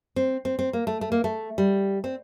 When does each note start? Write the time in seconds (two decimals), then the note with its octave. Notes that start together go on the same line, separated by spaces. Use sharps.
0.16 C4
0.45 C4
0.59 C4
0.73 A#3
0.87 A3
1.01 A3
1.12 A#3
1.24 A3
1.58 G3
2.04 C4